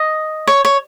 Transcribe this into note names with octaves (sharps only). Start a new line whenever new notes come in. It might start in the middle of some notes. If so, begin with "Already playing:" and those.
Already playing: D#5
C#5
C#5